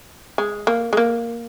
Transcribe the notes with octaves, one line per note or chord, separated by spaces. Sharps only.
G#3
A#3
G#3
A#3